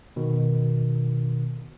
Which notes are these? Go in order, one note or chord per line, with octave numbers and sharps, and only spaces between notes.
B2 D#3